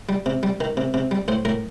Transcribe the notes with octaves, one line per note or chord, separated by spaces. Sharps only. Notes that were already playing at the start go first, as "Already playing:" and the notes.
G3
C3
G3
D#3
C3
C3
G3
A2 C5
A2 A#4